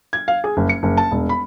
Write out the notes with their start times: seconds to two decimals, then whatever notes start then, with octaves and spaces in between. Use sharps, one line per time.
0.13 G#6
0.28 F5
0.44 G#4
0.57 F#1
0.69 C#7
0.83 F#1
0.97 A5
1.11 E1
1.29 B5